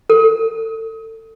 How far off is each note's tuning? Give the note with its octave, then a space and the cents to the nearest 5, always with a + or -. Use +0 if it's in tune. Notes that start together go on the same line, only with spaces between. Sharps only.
A4 +30